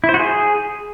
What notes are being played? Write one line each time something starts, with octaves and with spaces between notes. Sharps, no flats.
E4
C5
F#4
G#4